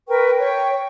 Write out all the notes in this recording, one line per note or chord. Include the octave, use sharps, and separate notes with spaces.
A#4 B4 G5 C#6
C#5 G5 C#6